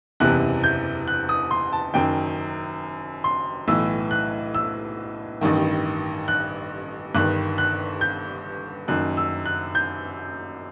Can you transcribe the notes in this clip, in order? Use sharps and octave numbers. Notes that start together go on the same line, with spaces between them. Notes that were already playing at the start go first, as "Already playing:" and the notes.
F#1 E2 C3 E3 F#6
G6
F#6
D#6
C6
A5
F#1 F#2 D#3 G5
C6
B1 A2 E3 E6
F#6
E6
A1 G2 D#3
F#6
G1 G2 D#3 F#6
F#6
G6
F#1 F#2 D#3 F#6
E6
F#6
G6